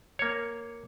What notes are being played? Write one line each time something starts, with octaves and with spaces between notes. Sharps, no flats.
A#3 C#5